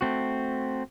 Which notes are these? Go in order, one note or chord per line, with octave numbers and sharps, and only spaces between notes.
A3 C4 F#4